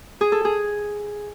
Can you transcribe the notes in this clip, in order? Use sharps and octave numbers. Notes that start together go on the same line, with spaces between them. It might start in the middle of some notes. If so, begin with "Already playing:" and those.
G#4
A4
G#4